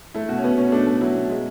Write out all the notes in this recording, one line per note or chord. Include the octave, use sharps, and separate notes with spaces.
A3 E4
B2 F#4
C#4
B2 B3
B2 C#4
A3 D4
A3
F#3 E4
B2
G#3